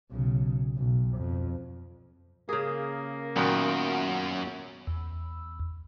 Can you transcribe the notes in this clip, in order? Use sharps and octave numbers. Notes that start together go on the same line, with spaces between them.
B1 C#3
B1
F2
C#3 A#3 G#4
F#2 A#2 D#3 B3 F#4 G5
E2